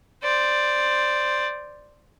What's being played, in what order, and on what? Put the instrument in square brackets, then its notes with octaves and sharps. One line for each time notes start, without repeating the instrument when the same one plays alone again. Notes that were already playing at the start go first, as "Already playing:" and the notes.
[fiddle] C5 D5